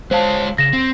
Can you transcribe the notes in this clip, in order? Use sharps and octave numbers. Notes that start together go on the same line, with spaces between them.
G#3 C5 C#5 F5 A5
C#3 A#6 E7
C4